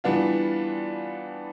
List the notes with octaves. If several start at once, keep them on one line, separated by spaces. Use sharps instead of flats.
E3 G3 B3 D4 F4